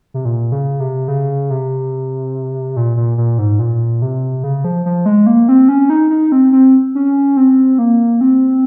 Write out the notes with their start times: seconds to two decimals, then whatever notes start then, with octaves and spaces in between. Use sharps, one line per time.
0.14 C3
0.25 A#2
0.52 C#3
0.80 C3
1.08 C#3
1.50 C3
2.76 A#2
2.97 A#2
3.18 A#2
3.39 G#2
3.59 A#2
4.02 C3
4.44 C#3
4.64 F3
4.86 F3
5.06 G#3
5.26 A#3
5.49 C4
5.69 C#4
5.90 D#4
6.10 D#4
6.32 C4
6.52 C4
6.95 C#4
7.37 C4
7.79 A#3
8.21 C4